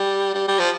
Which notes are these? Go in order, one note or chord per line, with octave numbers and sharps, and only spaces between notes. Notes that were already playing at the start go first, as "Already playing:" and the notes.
Already playing: G3
G3
G3
F3